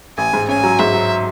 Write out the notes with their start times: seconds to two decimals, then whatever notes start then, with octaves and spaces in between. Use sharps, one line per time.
0.18 A1 G#5
0.33 G#2
0.48 C#4 G#5
0.63 F#3
0.79 G#2 E5
0.94 F#3